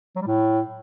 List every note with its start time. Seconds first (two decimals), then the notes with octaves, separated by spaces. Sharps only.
0.16 F#3
0.21 G3
0.27 A2